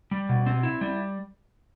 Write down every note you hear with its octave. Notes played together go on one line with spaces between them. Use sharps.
G3
B2
C4
E4
G3